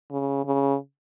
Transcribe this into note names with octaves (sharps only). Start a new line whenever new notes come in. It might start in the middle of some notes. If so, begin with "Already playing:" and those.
C#3
C#3